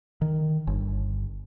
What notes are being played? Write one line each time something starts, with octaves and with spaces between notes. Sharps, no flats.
D#3
G1